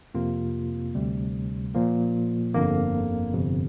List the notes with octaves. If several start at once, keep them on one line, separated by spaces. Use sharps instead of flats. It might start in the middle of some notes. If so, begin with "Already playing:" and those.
F2 C3 A#3 F4
D2 C3 G3
A#2 F3 A#3
G1 F2 D3 A#3
G1 F2 C3